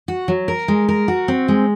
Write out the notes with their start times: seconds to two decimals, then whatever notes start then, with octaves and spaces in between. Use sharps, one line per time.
0.08 F#4
0.28 F#3
0.48 A#4
0.68 G#3
0.89 A#4
1.08 F#4
1.28 C4
1.48 G#3